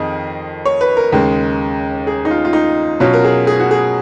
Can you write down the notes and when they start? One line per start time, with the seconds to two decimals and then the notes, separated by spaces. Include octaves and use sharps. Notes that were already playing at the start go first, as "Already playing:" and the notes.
Already playing: F2 D#3 G#4 D#5
0.65 C#5
0.81 B4
0.97 A#4
1.12 D#2 C#3 G#3
2.07 G#4
2.25 D#4
2.31 F4
2.45 F4
2.53 D#4
3.00 B2 F#3 C#4 F4
3.13 A#4
3.24 G#4
3.47 G#4
3.60 F#4
3.71 G#4